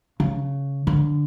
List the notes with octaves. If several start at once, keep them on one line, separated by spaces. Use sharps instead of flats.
C#3
D3